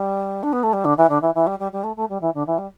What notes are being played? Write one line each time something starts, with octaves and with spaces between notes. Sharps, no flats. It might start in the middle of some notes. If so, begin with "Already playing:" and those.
Already playing: G3
D4
B3
A3
G3
D3
E3
D3
E3
E3
G3
G3
G3
A3
A3
G3
E3
D3
E3
G3